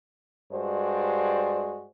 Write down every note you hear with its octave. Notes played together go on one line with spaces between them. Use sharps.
G2 G#3 F#4 C5 D5